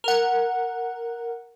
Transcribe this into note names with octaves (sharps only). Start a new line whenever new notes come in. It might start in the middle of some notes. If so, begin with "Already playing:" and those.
A#4 F#5